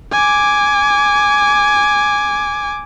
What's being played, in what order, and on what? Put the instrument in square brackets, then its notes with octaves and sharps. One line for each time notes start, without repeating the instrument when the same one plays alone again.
[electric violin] G#5 D6